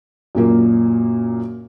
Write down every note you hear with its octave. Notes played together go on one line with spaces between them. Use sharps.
F#2 A#2 A#3